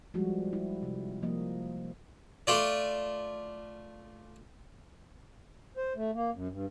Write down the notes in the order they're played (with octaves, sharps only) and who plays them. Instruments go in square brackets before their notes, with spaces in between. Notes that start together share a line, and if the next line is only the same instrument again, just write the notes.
[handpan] F3 G3 G#3 F#4
E4
C3
F3 A#3 D#5
[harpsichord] A3 F4 D5
[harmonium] C5
A3
A#3
F#2
G2